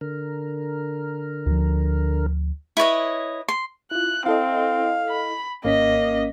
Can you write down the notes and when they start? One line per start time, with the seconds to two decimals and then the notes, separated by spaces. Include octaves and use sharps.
0.01 D3 A#4
1.46 D2 F3
2.77 E4 B4 C#5 D#5
3.48 C6
3.91 E4 F4 F#6
4.26 C4 E4 A4 D#5 F5
5.09 B5
5.65 G#1 A#3 C#4 D#5 B6